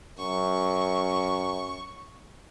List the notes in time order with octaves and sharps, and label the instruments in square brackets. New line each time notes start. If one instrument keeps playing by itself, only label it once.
[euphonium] F#2 [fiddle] C#6